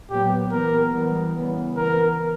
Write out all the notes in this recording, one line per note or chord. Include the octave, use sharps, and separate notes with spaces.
A#2 F#3 B3 G4
E3 B3 A#4
E3 G3 B3
C#3 E3 B3
E3 B3 A#4